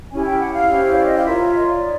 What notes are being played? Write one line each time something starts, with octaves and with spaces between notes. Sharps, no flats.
C#4 E4 G4 G#5
G5
F#5
F5
C#4 E4 G4 C5
C#5
D5
D#5
F5
F4 A#4 C#5 E5
D#5
D5
D#4